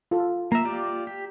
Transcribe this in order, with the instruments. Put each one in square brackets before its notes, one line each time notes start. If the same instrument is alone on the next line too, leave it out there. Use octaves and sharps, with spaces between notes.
[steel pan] F4 A4
[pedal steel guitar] A#3 E5 [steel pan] A#5
[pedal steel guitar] F4 G4 D5
G4